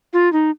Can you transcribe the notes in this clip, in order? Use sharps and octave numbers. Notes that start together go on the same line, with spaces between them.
F4
D#4